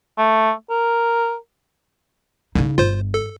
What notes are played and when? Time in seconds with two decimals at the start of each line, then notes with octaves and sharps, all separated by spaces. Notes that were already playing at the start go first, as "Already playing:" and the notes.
0.18 A3
0.70 A#4
2.55 C2 C#3 D#4
2.78 G1 F4 C5
3.14 A4